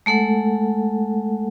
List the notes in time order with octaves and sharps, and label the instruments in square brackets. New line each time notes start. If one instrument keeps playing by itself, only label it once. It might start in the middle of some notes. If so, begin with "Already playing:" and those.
[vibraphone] G#3 A3 A4 F#5